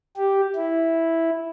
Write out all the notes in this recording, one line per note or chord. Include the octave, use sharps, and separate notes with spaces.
G4
E4